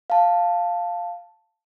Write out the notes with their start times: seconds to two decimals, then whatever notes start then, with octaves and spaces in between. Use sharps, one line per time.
0.10 F5 A5